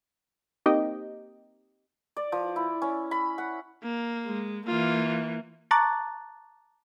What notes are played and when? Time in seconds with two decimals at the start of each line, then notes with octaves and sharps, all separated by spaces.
0.66 A#3 C4 D#4 G4 D#5 G5
2.17 D5
2.32 F3
2.56 E4
2.82 C#4
3.11 B5
3.38 F#5
3.83 A#3
4.26 G#3
4.67 E3 A#3 F4
5.71 A5 A#5 C#6 D6 F#6 A6